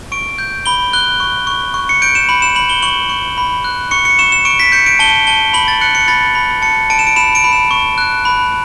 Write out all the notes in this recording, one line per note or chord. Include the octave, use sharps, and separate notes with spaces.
C#6 D7
G6
B5 G7
F#6 G7
C#6
C#6
C#6
C#7
G6 D7
E7
B5 F#7
E7
B5 F#7
G7
C#6 F#7
C#6
B5
F#6
C#6 C#7
C#7
C#6 E7
E7
C#6 D7
B6
G6 C#7
D7
A5 G7
A5 G7
B5 F#7
A6
F#6 C#7
C#7
B5 A6
B5
A5 C#7
A5 D7
E7
D7
B5 E7
D7
B5
E7
C#6
F#6
B5